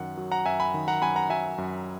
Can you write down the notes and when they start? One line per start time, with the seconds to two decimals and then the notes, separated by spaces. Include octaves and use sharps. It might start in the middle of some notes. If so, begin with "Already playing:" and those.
Already playing: F#2 D#3 F#5
0.17 F#3
0.31 F#5 A#5
0.46 F#2 E5 G#5
0.60 G#5 B5
0.74 D#3
0.88 F#5 A#5
1.02 F#2 G#5 B5
1.16 F#5 A#5
1.30 F#3 E5 G#5
1.58 F#2